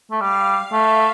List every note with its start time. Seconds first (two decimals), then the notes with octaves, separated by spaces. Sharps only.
0.11 A3
0.21 G3 F5
0.72 A3 E5